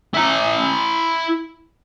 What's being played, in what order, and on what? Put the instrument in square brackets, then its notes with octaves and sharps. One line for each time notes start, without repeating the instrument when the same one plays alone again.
[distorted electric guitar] E4 A#5